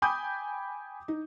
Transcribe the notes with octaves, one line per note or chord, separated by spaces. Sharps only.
G5 G#5 B5 D6 D#6 G6
D#4